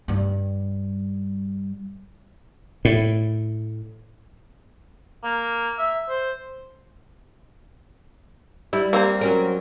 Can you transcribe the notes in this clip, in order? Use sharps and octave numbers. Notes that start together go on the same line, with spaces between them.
G2 G3
A2
A#3
E5
C5
G3 E4
A#3 C4 A#5
F#3 C#4 A#4